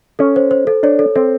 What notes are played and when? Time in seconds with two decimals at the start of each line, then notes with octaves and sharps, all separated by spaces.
0.19 C#4 A4
0.36 C5
0.51 C5
0.67 A4
0.83 D4 C#5
0.99 A4
1.16 C4 A4